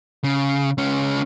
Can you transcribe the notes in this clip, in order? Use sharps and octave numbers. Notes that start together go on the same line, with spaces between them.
C#3
C#2 C#4